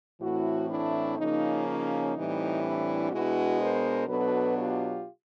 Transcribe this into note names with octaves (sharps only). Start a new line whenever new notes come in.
A2 E3 A3 C4 E4 F#4
D4 E4
C#3 F3 A#3 C#4 D#4
D#4
A2 E3 G3 C4
D4 E4
B2 G#3 B3 D4 E4 F#4
A#4 C5
B2 F#3 B3 D4 A4 B4
F4 G4